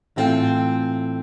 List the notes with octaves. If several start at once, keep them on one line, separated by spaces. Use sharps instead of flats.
A2 E3 C4 F4 A4 G5